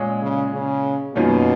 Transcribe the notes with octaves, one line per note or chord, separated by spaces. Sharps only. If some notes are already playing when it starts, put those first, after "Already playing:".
Already playing: A#2 G#3 C#4 G#4 C#5
C#3
C#3
F#2 B2 D#3 A#3 C#4 F4